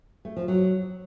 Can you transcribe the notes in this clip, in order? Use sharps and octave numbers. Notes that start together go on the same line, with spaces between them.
A3
F3
F#3